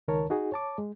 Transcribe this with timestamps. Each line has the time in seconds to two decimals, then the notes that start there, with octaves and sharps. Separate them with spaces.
0.08 C#2 D#3 A#4 C#5 A5
0.30 D#4 F#4 G#4
0.52 C#5 A5 D6
0.78 G#3